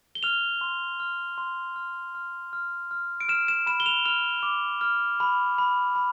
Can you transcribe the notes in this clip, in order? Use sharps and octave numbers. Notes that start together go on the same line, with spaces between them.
G7
F6 F7
C6
F6
C6
F6
F6
F6
F6
D7
F6 E7
E7
B5 E7
G7
F7
F6 F7
D6
F6
B5
B5
B5